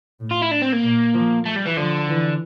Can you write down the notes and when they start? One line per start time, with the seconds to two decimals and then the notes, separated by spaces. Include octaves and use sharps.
0.20 A2
0.31 F4
0.42 E4
0.51 D4
0.62 C4
0.72 A#3
0.83 A#2
1.14 F3
1.46 A3
1.56 G3
1.66 E3
1.77 D3 F3
2.08 E3